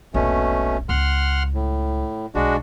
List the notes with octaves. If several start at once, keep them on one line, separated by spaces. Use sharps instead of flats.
D#1 A#1 B2 A3 C#4
C#2 F#5 C6 F6
A2
B1 G#3 D4 F#4